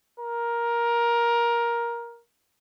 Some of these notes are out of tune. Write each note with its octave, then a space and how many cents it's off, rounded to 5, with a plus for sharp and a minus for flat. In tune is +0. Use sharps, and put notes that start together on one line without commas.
A#4 +15